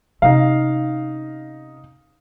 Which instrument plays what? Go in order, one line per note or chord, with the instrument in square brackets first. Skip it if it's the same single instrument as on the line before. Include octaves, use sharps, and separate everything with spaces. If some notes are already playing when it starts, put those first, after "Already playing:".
[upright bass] C3 C#4 [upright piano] D#4 F5